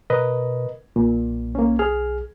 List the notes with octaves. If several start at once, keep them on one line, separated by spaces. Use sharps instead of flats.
B2 A#4 B4 D#5
B1 A#2
A#3 C#4
G#4 F6